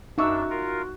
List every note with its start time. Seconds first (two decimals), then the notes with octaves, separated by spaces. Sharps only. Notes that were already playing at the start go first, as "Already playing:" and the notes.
0.18 F#2 D4 D#4 F#4 E5 C#6 E6
0.50 F4 A#4